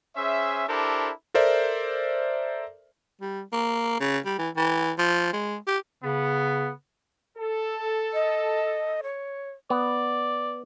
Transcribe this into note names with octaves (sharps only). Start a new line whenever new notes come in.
C#4 G#4 C5 E5
D4 E4 G4 A4 A#4 C5
A4 A#4 C5 D5 E5
G3
A#3
C#3
G3
E3
E3
F3
G#3
G4
C#3 B3
A4
D#5
C#5
B3 D5